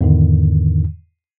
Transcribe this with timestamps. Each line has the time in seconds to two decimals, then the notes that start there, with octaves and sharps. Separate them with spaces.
0.01 E2 G#2 D3 D#3